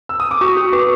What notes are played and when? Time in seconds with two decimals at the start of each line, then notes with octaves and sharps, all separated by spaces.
0.09 E6
0.20 D#6
0.31 D6
0.41 F#4 C#6
0.57 F#4
0.73 B4 D6